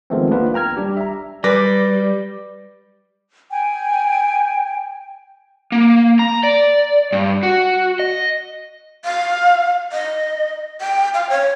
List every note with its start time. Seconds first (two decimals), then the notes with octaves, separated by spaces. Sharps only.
0.10 D#3 F3 G#3 A3 B3 C4
0.31 A#3 B3 D4 F4 B4
0.54 G5 A#5 F6 G#6
0.77 G3 D4 G4
0.97 E5 A#5
1.44 G3 B4 D5 D6 A#6
3.50 G5 G#5
5.72 A#3
6.19 A#5
6.43 D5
7.12 G2
7.43 F#4
7.99 D#5
9.05 F5
9.92 D#5
10.81 G5
11.14 F5
11.29 C#5